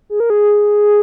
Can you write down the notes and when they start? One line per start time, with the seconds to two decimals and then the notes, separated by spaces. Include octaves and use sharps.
0.10 G#4
0.20 A#4
0.30 G#4